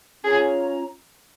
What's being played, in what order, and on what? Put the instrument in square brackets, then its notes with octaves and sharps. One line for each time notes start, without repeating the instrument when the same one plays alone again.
[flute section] C#4 F4 C#5 A#5 [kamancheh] G#4